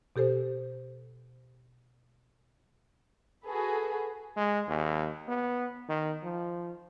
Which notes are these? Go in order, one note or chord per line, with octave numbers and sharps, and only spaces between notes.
B2 G4 A4 C5
F#4 G#4 A4 B4
G#3
D#2
B3
D#3
F3